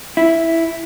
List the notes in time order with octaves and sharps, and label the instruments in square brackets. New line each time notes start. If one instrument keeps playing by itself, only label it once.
[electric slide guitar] E4